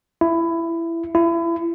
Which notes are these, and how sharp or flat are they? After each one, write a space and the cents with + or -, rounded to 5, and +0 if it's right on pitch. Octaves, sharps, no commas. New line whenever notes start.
E4 +15
E4 +30